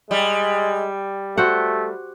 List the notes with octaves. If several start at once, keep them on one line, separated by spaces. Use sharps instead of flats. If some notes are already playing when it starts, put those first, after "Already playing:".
G3 G#3
A3 F#4 C5 F#5